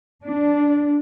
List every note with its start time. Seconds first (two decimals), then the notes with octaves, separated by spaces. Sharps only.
0.23 D4